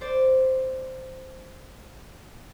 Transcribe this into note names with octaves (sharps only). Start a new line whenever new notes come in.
C5 D5